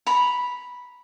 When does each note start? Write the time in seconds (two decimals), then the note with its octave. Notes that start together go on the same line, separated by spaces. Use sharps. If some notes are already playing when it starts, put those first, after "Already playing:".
0.07 A#5 B5